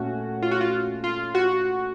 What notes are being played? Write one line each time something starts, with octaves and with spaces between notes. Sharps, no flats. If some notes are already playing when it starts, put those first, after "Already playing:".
Already playing: A#2 A3 C#4 F#4
F4
F#4
F4
F4
F#4